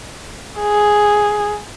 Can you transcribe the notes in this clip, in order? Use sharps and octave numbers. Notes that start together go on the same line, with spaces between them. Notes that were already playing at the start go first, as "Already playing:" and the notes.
G#4